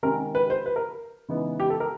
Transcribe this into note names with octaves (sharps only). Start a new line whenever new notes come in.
C3 D#3 G#3 C#4 A#4
B4
C5
B4
A#4
C#3 E3 G#3 B3 D#4
G4
A4
A#4